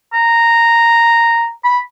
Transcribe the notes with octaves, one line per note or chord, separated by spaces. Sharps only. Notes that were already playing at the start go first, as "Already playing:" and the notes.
A#5
B5